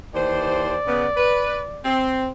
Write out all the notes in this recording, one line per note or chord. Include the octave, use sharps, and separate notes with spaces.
D#2 E3 C5 D5
C#3 B3
B4
C4